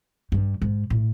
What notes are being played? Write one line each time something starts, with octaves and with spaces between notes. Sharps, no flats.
G2
G#2
A2